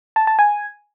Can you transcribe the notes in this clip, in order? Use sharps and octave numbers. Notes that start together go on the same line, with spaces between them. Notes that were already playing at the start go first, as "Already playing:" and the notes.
A5
A5
G#5